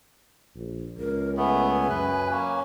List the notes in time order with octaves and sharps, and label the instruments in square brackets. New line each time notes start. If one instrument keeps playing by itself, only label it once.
[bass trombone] A#1
[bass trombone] C#2 [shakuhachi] A#4
[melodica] A3 B3 [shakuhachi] G#5
[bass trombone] F#2 [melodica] B4
[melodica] A#3 C#4